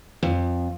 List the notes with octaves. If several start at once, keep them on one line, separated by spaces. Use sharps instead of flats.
F2